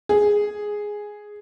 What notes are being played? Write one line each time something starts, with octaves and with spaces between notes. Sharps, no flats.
G#4